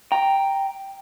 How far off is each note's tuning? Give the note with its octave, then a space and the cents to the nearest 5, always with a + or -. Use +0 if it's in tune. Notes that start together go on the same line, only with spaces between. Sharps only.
G5 +0 A#5 +0